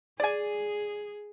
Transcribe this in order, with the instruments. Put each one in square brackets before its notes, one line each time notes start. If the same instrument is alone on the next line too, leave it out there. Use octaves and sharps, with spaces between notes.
[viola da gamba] G#4 [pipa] D5 G#5